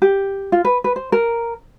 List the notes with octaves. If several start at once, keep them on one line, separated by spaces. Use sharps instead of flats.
G4
F4
B4
B4
C5
A#4